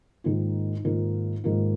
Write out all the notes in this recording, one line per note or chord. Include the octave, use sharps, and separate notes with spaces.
G#2 D#3 A#3 F4
G#2 D#3 A#3 F4
G#2 D#3 A#3 F4